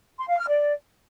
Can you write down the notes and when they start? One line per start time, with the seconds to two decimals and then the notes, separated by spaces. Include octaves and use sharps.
0.19 C6
0.28 F5
0.38 F6
0.48 D5